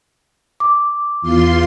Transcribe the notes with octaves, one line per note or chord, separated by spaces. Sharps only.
D6
E2 F4 C6